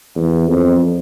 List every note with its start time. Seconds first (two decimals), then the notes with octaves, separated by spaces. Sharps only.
0.16 E2
0.47 F2